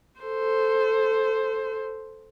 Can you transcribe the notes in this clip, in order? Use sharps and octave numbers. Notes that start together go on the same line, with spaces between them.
A4 C5